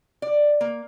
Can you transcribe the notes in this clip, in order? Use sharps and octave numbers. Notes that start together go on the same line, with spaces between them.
D5
A#3